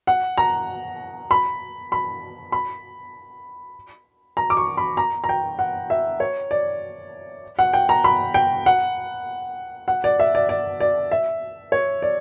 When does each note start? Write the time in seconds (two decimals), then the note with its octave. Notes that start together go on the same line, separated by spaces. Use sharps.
0.07 F#5
0.37 A#5
1.31 B5
1.92 B5
2.52 B5
4.37 A#5
4.50 D6
4.57 C#6
4.77 B5
4.97 A#5
5.24 A#5
5.29 G5
5.59 F#5
5.90 E5
6.20 C#5
6.51 D5
7.59 F#5
7.73 G5
7.89 A#5
8.04 B5
8.34 G5
8.66 F#5
9.88 F#5
10.04 D5
10.20 E5
10.35 D5
10.49 D5
10.80 D5
11.11 E5
11.72 C#5
12.02 D5